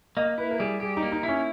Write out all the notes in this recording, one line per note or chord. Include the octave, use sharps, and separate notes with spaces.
A#3 D#5
E4 B4
A#4
G3 G#4
G4 G#4
D#4
A#3
D#4
E4
C#4